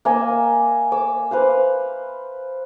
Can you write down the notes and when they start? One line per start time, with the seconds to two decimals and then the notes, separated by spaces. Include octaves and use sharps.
0.05 A#3 D#5 G#5 E6
0.92 D6 E6
1.31 B4 C5 F5